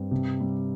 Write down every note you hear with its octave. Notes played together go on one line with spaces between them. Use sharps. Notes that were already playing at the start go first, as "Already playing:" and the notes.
Already playing: G2 C4
C3
G3